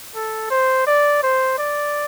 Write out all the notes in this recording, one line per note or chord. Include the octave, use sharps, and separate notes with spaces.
A4
C5
D5
C5
D5